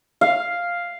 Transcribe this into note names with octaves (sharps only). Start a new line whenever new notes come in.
F5